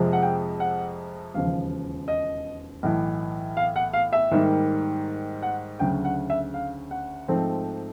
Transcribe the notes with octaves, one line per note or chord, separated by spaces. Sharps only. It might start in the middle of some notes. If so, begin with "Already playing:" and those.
Already playing: F2 C3 F3 G#3
F#5
G5
F#5
E1 D#2 C#3 F3 F5
D#5
B1 A2 E3
F5
F#5
F5
E5
G#2 D#3 G3 A#3
F#5
D2 C#3 F#3 G5
F#5
E5
F5
F#5
G#2 F3 A3 C4